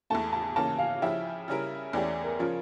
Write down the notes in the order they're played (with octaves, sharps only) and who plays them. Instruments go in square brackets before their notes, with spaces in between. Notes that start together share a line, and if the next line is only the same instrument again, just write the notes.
[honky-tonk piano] E2 E3 A3 [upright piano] A5
[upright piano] A5
[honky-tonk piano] C#3 E3 A#3 C#4 [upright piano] A5
[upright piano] F5
[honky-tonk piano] C#3 F3 C#4 E4 G4 [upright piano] E5
[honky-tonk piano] C#3 G3 C#4 E4 A#4
[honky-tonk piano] E2 E3 A3 C#4 G4 [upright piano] D5
[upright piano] A#4
[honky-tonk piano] C#3 F3 C#4 [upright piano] F4